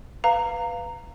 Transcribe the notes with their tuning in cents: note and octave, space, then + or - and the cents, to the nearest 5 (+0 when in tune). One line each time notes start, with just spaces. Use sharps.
B4 +0 F5 +0 A#5 -10